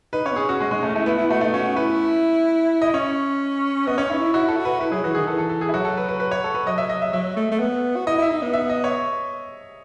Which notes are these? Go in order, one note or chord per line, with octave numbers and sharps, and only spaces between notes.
D#4 B4
C#4 C#5
B3
C#4 G#4
C#4 F#4
G#3 C#4
G#3 D#4
A3 C#4
A3 E4
B3 E4
E4
A3 F#4
A3 D#4
C#4 F#4
E4 B4
D#5
C#4 C#5
B3 D#5
C#4 C#5
D#4 E4
E4
E4 F#4
A4
F#4
B4
E4 B4
F#3 G#4
E3 F#4
D#3 G#4
E3 A4
A4
A4
G#4
E4
F#3 F#4
A4
B4
B4
B4
C#5
A4
B4
F#3 D#5
E5
D#5
E5
F#3 E5
A3
A3
B3
F#4
E4 D#5
E4 E5
D#4
B3
E5
D#5
C#5